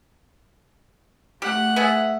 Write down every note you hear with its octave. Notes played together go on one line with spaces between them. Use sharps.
A3 G4 F#5
B3 G#4 E5